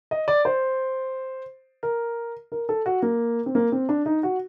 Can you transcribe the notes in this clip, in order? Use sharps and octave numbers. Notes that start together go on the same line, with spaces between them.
D#5
D5
C5
A#4
A#4
A4
F#4
A#3
C4
A#3
C4
D4
D#4
F#4